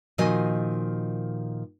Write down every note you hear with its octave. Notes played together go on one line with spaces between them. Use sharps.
A#2 D#3 F3 F#4 D#5 G#5